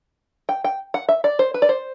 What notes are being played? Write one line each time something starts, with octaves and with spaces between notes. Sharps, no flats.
G5
G5
F#5
E5
D5
C5
B4
D5
C5